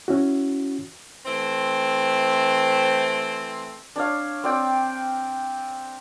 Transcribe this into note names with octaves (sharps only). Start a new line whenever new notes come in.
C#4 E4 F#4
E3 A3 C4
D4 C#5 F5
C4 D5 G5